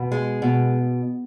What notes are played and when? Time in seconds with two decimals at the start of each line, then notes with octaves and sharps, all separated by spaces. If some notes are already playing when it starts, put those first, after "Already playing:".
Already playing: B2
0.12 G#3
0.42 B2